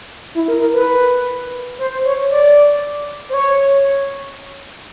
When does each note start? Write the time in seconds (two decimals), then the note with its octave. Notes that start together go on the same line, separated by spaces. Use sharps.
0.35 E4
0.48 A#4
0.61 A#4
0.74 B4
1.79 C5
2.05 C#5
2.30 D5
3.29 C5
3.34 C#5